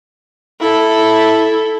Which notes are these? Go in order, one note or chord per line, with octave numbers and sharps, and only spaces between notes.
E4 A4